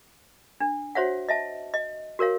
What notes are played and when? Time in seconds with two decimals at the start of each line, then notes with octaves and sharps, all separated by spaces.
0.60 D4
0.95 F#4 C5 C#5 E5 F#5
1.29 D#5 E5 A5
1.74 D#5
2.19 F#4 A#4 C#5 F5